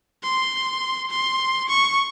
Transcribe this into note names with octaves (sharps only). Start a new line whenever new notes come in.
C6
C6
C#6